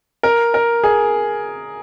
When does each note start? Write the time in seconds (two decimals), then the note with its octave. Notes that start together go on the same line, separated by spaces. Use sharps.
0.23 A#4
0.54 A#4
0.84 G#4